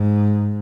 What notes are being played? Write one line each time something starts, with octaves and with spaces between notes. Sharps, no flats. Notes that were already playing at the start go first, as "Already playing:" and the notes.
Already playing: G#2